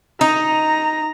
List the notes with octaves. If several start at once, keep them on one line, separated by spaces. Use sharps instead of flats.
D#4 A#5